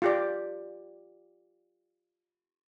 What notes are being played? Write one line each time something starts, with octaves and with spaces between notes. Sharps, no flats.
F4 G4 D5